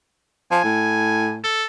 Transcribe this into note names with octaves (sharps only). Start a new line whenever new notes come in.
F3 G#5
A2
A4